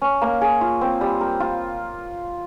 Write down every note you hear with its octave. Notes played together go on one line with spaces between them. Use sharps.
C#4
A#3
G#4
F4
C4
G3
A#4
F4